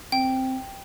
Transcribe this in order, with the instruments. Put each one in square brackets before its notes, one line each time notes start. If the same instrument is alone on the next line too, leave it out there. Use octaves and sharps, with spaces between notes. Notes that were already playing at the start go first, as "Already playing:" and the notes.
[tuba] C4 [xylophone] G5